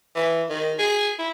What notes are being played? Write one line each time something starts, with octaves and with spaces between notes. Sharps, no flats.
E3
D#3
G#4
E4